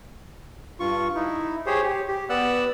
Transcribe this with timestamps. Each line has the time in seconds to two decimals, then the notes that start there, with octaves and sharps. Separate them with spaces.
0.80 G2 F4 C#6
1.15 D#4 E4
1.66 G4 G#4 C5 C#5
1.83 G4
2.08 G4
2.29 B3 D5 F#5 E6 F#6